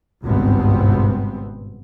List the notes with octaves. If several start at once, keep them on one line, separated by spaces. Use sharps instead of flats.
G#1 C#2 G2 B2 B3 C4